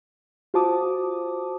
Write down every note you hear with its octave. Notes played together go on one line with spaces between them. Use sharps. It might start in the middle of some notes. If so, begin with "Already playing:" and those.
F4 F#4 C5 A5 D6 D#6